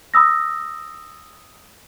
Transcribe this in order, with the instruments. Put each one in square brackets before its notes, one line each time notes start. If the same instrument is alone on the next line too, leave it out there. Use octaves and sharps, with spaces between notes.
[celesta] B5 D#6 E6 A#6